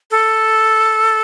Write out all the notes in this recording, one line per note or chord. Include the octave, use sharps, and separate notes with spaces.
A4